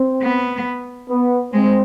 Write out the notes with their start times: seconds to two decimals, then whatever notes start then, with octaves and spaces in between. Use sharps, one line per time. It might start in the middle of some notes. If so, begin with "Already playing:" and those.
Already playing: C4
0.22 B3
1.09 B3
1.54 G#3 C4